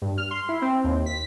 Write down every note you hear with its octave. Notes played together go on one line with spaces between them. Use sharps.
G2
F6
C6
E4
C4
D#2
B6